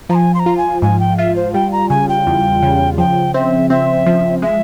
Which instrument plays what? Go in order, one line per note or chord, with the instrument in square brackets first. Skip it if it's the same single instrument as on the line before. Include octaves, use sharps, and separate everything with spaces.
[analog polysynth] F3 [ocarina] A#5
[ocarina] G#5
C6
A#5
[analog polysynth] F4
[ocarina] G#5
[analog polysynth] G#2 [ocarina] G#5
[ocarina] G5
[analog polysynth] F4 [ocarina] E5
[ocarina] C5
[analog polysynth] G3 [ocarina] G5
[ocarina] A#5
[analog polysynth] C#3 [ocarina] G#5
[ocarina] G5
[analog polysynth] E2
C#3
[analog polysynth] F3 [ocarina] G5
[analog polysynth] C4 [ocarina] E5
[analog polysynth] C4 [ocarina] E5
[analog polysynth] F3
[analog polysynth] G#3 [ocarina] E5